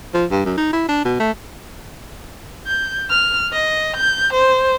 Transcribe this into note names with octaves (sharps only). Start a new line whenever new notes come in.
F3
G2
F#2
D#4
E4
D4
B2
A3
G6
F6
D#5
G6
C5